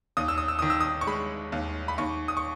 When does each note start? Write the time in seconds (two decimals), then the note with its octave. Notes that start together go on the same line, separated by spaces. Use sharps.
0.17 D#2 D#6
0.28 E6
0.38 D#6
0.48 E6
0.59 D#3 D#6
0.70 E6
0.81 D#6
1.01 C#6
1.07 G#3 B5
1.52 D#2
1.88 B5
1.98 D#2 C#6
2.28 D#6
2.37 C#6